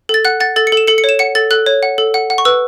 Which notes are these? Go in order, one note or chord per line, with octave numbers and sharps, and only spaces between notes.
A4 A6
F#5 F#6
F#5 A6
A4 A6
C#7
A4 E7
A4 C#7
C#7
C#5 E7
F#5 C#7
A4 A6
A4 F#6
C#5
F#5
A4
F#5
F#5
C#6
B4 E6